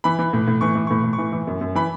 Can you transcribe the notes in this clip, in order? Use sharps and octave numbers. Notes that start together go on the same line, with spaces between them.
E3 B5
E3
A2
A2
E3 C#6
E3
A2 C#6
A2
C#6
E3
E3
F#2
F#2
E3 B5